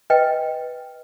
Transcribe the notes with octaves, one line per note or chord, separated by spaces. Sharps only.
B4 D#5 G5